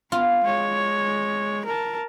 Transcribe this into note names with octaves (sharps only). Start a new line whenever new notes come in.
B3 F4
G#3 C#5
A#4 A5